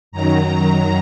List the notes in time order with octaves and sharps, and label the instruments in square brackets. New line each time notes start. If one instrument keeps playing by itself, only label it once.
[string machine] F#2 D#3 F#3 A#5